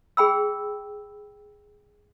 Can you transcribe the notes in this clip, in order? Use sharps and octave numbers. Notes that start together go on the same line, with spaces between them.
G#4 G5 B5 E6